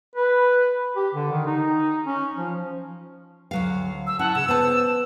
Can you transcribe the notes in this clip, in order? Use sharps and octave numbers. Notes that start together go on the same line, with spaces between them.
B4
G4
D3
D#3
D#4
C#4
F3
D2 F#3 F5
E6
C#4 E4 F#5 A5
C#3 E6 E7
B3 C5 A5